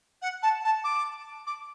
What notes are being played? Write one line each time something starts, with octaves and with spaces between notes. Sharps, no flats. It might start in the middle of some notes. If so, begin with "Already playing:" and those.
F#5
A5
A5
D6
D6